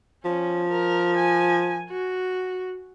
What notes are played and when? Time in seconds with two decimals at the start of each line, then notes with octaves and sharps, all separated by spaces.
0.25 F3 C#4
0.69 A#4
1.17 G#5
1.90 F#4